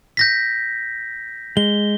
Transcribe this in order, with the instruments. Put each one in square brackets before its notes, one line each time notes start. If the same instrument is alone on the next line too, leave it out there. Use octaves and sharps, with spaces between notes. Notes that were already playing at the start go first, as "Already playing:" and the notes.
[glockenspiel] G6 A#6 B6
[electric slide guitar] G#3 [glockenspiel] G7